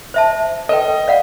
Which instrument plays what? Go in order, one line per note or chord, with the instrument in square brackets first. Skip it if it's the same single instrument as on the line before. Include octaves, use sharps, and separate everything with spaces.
[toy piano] C5 E5 A5
[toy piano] A4 B4 G5 [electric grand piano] D#5
[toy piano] D5 F5 F#5